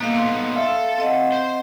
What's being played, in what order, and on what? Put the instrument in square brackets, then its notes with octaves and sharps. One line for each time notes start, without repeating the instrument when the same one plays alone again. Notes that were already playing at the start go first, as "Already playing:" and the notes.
[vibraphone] A#3 F5 [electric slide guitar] B3 D#4 A4
[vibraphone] C6
[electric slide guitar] A4 [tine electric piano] E5 F5
[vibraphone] C4 D#5 F#5
[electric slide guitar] C5